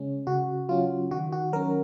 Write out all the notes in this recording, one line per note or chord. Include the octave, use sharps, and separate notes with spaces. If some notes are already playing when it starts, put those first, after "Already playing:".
Already playing: C#3 G#3 C#4
C#3 F#4
F#3 C#4 F4
D#3 F#4
F#4
F#3 C#4 A#4